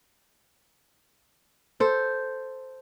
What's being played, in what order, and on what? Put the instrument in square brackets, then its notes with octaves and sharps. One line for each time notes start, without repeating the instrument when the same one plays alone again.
[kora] A4 C5